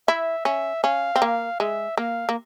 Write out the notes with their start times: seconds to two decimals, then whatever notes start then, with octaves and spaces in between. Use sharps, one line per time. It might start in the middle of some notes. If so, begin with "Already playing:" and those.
0.08 E4 E5
0.45 C#4 E5
0.84 C#4 F5
1.16 C4
1.22 A#3 F5
1.60 G#3 E5
1.97 A#3 F5
2.29 A#3